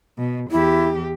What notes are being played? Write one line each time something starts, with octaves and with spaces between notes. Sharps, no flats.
B2
E2 E4 G4